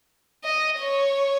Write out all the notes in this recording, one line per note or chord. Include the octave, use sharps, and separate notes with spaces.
D#5
C#5